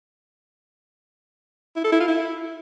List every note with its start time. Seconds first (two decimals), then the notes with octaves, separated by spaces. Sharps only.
1.76 E4
1.84 A4
1.92 E4
2.00 F4
2.08 E4